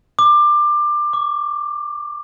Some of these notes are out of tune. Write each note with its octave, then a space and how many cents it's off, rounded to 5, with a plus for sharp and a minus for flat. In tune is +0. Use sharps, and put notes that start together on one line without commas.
D6 +20
D6 -40